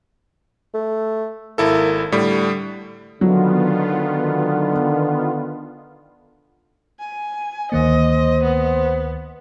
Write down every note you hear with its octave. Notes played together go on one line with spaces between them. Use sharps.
A3
G#1 A#3 E4 A4
A2 D3 G3
D3 D#3 F#3 B3 F4
G#5
D2 D#3 A#3 C5 D#5
B3